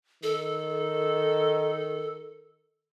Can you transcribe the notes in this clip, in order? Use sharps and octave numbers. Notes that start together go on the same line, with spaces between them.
D#3 A4